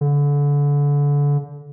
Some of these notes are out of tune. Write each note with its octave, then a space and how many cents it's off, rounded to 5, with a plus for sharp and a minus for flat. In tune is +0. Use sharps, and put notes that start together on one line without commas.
D3 -30